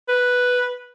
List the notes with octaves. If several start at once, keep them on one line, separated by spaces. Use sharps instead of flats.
B4